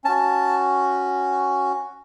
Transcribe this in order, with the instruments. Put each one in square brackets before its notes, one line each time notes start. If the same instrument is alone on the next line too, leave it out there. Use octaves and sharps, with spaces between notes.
[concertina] C#4 F#4 A5